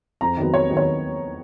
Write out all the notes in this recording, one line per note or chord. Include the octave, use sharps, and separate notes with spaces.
F2 A#5
D#3 F#3 B3
F2 C#5
D#3 F#3 B3
C#5